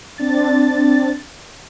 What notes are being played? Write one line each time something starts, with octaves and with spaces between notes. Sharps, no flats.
C4 D4 A6